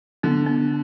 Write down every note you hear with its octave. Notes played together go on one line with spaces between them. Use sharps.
D3 B3
B3